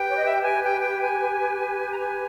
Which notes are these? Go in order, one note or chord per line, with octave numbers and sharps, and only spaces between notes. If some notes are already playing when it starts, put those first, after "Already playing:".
Already playing: G4 B4 G5
C#5
D#5
E5
G5
G#5
G5
G5
G#5
A#5
G#5